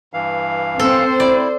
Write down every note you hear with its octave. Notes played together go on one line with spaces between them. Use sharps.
G2 E3 F5
C4 A4 C5
E4 D5